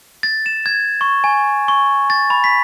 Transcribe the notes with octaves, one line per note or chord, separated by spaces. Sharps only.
A6
E7
G#6
C#6
G#5
C#6
A6
B5
B6